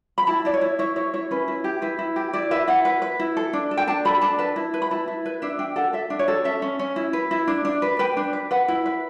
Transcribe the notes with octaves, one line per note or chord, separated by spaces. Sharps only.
B5
E4 A5
E4 D5
C#5
E4
E4 C#5
E4 C#5
E4 C#5
C#4 B4
E4
G4
E4 B4
E4
G4
E4 D5
B4 E5
E4 F#5
B4
B4
E4
A4
D4
A4
G5
D4 A5
A4 B5
D4 A5
B4 A5
E4
B4
B5
E4 A5
E4
B4
D4 E5
D4 G5
A4 F#5
A4 E5
D4
C#5
A4
C#4 E5
C#4
C#4
E4
B4
E4
D4
D4
B4
B4 G5
D4
B4
B4 F#5
E4
B4